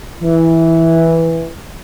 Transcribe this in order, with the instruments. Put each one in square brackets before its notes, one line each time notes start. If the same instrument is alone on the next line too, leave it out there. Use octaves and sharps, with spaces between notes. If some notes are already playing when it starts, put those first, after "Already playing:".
[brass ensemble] E3